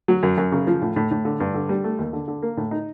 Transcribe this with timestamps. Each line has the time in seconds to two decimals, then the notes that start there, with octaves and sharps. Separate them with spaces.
0.08 F#3
0.23 F#2
0.38 F#2
0.52 C#3
0.67 F3
0.81 A2
0.96 A2
1.11 A2
1.25 D3
1.40 G2
1.54 D3
1.69 G3
1.84 A3
1.99 D#2
2.13 D3
2.28 D3
2.42 A#3
2.57 A2
2.71 D#4